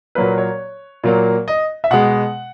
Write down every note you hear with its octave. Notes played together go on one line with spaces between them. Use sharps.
A#2 F#3 A#3 B4
C#5
A#2 F#3 A#3
D#5
E5
B2 G#3 F#5